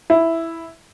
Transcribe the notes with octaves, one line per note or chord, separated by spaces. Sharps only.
E4